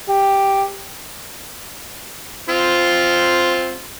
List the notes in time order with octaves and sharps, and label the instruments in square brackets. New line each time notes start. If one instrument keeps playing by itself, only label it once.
[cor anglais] G4
[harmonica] C4 F4